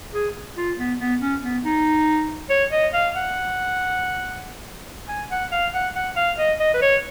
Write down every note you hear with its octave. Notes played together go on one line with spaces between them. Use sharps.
G#4
F4
B3
B3
C#4
B3
D#4
C#5
D#5
F5
F#5
G#5
F#5
F5
F#5
F#5
F5
D#5
D#5
B4
C#5